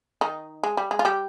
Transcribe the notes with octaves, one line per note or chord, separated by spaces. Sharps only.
D#3 D#4
G#3
G3
G#3
F4
G3 G4